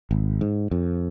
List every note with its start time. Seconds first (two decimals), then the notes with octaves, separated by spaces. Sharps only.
0.11 G#1
0.41 G#2
0.71 F2